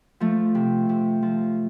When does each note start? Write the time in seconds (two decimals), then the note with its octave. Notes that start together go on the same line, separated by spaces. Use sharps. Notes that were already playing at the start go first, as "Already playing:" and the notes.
0.20 F3 A3
0.55 C3
0.89 C3
1.22 F3